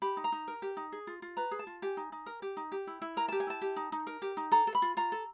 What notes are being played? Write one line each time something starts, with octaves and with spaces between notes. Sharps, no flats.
G4 B5
D#4
A#5
D#4
A#4
G4
D#4
G#4
F4
F4
B4 A#5
G#4
A5
F4
G4 G#5
D#4
D#4
A#4
G4
D#4
G4
E4
E4
A#4 A#5
A5
G4
G#5
E4 A5
G4
D#4
D#4
A#4
G4
D#4
A4 A#5
A4
B5
F4
F4 A#5
A4